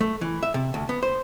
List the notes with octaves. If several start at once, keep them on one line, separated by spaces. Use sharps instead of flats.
A3
E3
E5
C3
D2
B3
C5